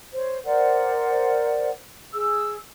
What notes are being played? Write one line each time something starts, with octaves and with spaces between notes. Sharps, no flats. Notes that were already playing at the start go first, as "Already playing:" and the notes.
C5 C#5
A#4 C5 D5 F#5
G#4 E6